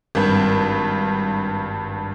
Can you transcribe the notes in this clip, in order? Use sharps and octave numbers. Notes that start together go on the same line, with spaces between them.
G#1 G2